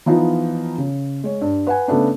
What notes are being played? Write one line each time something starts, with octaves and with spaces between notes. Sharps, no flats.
E3 F3 B3 D#4 F4
C#3
G#3 C#5
G2
B4 F#5 G#5
C#3 A3 B3 D4